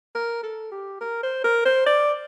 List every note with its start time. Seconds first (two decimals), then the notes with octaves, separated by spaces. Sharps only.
0.15 A#4
0.43 A4
0.72 G4
1.01 A#4
1.23 C5
1.45 A#4
1.65 C5
1.86 D5